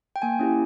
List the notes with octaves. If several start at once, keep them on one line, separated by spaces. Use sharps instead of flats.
G5
A#3 G#5
C#4 E4 G4